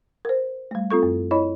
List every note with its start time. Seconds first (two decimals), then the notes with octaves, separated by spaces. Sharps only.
0.25 A#4 C5
0.71 G3 A3
0.91 C4 F4 A4 C#6
1.03 F#2
1.31 E4 C#5 D#5 B5